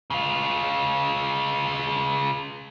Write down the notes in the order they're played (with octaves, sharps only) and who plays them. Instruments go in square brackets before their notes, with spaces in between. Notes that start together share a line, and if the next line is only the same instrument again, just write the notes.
[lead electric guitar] C#3 F4